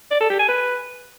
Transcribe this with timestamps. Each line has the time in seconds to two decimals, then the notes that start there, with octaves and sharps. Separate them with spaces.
0.11 D5
0.21 A4
0.30 G4
0.39 G#5
0.49 B4